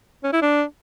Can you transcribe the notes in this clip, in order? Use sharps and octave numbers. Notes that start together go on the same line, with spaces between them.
C#4
E4
D4